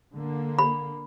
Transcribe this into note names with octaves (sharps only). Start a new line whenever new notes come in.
D3 A#3
B5